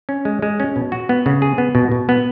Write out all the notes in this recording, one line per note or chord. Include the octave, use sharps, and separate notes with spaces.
C#4
G#3
G#3
C#4
B2
F#4
B3
C#3
G#4
B3
B2
B2
B3